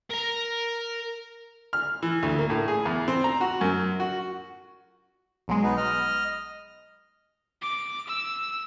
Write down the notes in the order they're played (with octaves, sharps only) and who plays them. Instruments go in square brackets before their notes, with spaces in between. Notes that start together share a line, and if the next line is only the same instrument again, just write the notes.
[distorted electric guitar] A#4 A#5
[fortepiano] F6
E3
D2
A#3
A2
G#4
E2
C4
A#5
F#4
F#2
F#4
[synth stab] B1 F#3 G#3
[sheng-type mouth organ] B3 D#4
D#5 F6
[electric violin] D6
E6